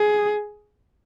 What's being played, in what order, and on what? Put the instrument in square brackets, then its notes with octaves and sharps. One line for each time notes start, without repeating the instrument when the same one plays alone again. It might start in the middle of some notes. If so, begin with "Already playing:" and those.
Already playing: [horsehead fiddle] G#4